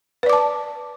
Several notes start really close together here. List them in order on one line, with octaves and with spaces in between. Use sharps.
B4 D5 D6 A5